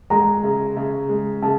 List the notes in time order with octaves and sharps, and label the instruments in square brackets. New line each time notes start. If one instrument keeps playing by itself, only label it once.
[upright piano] G#3 [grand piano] A#5
[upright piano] C#3
C#3
G#3
[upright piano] C#3 [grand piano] A5